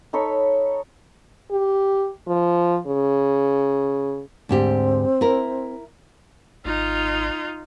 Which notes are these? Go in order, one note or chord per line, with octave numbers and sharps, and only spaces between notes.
D#4 A4 C#5 B5
G4
F3
C#3
D2 G#2 C4 G4
E4 A#4
G#1 D#4 F4